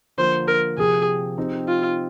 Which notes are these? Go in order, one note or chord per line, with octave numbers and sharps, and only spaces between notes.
D3 F3 A#3 F4 C5
A#4
C3 F3 C4 G4 G#4
F3 C4 D#4 G4
F4